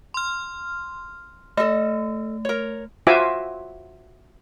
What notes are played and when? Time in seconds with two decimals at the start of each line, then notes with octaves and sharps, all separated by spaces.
0.14 C6 F6
1.57 A3 A4 D#5
2.45 A#4 C#5
3.07 F4 F#4 C5 E5 G#5 D6